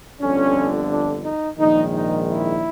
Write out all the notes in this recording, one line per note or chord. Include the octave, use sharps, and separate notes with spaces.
G1 F2 D3 C#4
D4
D#4
A#1 G#2 D#3 D#4
D#4
E4